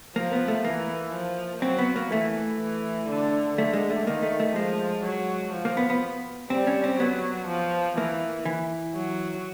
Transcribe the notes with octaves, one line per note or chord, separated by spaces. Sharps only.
F3 A#3
B3
A3
E3 A#3
F3
F#3 C4
B3
A#3
E3 A3
E3
D3
D3 A3
G#3
A3
D#3 A#3
A3
A3
F3 G#3
F#3
F3
A#3
B3
B3
G3 C4
C#4
C4
F#3 B3
F3
E3 A#3
E3
F#3